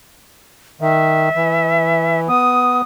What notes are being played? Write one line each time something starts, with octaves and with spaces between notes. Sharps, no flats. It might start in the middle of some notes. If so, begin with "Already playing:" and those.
D#3 E5
E3
B3 D#6